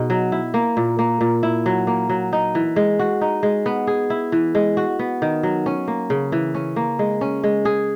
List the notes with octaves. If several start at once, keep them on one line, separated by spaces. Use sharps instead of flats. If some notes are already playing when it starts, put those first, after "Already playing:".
Already playing: B2 D#4 G#4
F#3
E4
A#3
A#2
A#3
A#2
E4
F#3
A#3
F#3
D#4
E3
G#3
F#4
D#4
G#3
B3
G#4
E4
E3
G#3
F#4
B3
D#3
F#3
C#4
A#3
C#3
E3
C#4
A#3
G#3
C#4
G#3
G#4